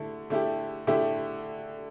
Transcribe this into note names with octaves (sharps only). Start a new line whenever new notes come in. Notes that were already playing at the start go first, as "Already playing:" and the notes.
Already playing: D3 A3 E4
D3 A3 E4 G4
D3 A3 E4 G4